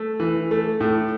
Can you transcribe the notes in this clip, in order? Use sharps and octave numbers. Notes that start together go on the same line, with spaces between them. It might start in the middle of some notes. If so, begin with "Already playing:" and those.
Already playing: A3
E3
A3
A2